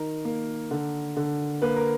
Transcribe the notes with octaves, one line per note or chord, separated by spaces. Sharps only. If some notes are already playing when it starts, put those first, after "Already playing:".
Already playing: D#3 A#4
A#3
D3
D3
A#3 B4
A#4